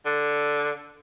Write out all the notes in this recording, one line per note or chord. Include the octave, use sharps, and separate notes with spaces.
D3